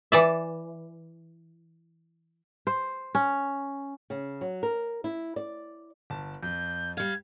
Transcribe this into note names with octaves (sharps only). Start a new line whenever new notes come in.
E3 D5 E5
C5
C#4
C#3
F#3
A#4
E4
D5
G1 A5
F2 G6
G3 F5 G#6